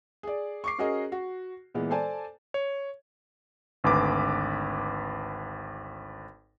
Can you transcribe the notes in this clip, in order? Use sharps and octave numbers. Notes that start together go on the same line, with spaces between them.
G#4 D5
C#6 D6 C7
C#4 F#4 G#4 A#4 D#5
F#4
A#2 E3 G#3 B3
A4 C5 D5 G#5 A5
C#5
G#1 D2 B4 D6